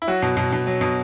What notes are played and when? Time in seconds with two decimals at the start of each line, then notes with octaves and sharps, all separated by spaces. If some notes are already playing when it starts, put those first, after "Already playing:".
0.02 E4
0.08 F#3 F#4
0.22 B2
0.37 B2
0.52 B2
0.67 F#3
0.81 B2